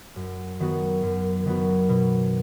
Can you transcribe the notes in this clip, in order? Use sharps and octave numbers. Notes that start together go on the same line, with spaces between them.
F#2
D#3 F#3 B3 F#4
F#2
D#3 F#3 B3 F#4
B2